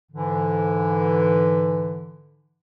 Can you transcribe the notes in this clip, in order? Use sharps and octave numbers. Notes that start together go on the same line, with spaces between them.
G#2 D3 E3